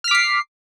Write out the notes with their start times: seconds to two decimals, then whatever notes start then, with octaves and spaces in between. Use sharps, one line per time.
0.04 F6
0.08 B6
0.11 D6
0.15 C7